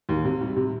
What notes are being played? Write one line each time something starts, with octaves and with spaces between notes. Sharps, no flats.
D#2
C3
G3
C3